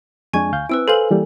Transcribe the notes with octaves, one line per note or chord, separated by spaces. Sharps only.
F2 G#3 D4 G#5 C#6 G#6
D2 F5 G6
C4 E4 B4 E6 D7
A4 B4 C5 F5 G#5 F#7
E3 G3 A#3